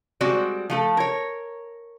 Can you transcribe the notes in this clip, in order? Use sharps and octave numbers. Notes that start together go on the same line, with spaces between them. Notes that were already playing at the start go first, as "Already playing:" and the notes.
G3 G#3 C4 F#4 D5
F3 A3 A4
A#4 C#5